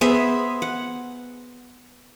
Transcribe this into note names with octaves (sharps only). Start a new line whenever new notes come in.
B3 G#4 C5 E5
F#5